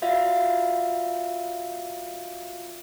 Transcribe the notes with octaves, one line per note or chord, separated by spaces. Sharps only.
F4 F#4 D5 E5 F5